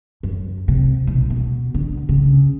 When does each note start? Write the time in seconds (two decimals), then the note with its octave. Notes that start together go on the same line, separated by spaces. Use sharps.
0.23 F#2
0.68 C3
1.07 B1
1.30 B2
1.74 D3
2.09 C#3